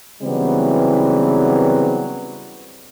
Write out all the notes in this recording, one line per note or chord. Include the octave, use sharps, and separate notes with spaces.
C#3 E3 F#3 G3 B3 C4